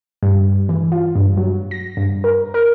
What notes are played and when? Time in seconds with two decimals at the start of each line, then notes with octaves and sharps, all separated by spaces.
0.23 G2
0.69 E3
0.92 F4
1.15 G2
1.37 F#3
1.71 A#6
1.97 G2
2.24 A#4
2.54 A#4